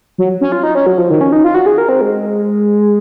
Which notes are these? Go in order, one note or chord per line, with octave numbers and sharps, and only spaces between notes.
F#3
C#4
F4
D#4
C#4
F#3
F3
D#3
C#4
D#4
F4
F#4
G#4
A#4
C4
G#3